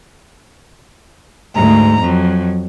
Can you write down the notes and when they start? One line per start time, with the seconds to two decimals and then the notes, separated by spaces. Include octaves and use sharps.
1.54 D2 G#2 A#5
2.01 F2 F#3